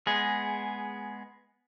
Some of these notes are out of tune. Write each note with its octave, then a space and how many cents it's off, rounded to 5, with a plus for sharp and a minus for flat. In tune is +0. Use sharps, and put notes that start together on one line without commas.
G#3 +10 B3 +0 G#4 +0